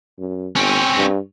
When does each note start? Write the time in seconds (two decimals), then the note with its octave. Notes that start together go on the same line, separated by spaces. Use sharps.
0.19 F#2
0.56 G1 C4 C#4
0.96 G2